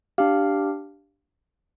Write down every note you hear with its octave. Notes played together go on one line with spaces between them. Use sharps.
D4 G4 F5